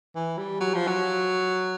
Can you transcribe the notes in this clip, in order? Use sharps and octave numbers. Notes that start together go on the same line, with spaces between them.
E3
G3
F#3
F3
F#3